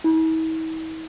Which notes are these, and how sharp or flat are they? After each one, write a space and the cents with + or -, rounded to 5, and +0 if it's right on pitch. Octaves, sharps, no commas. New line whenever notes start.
E4 -45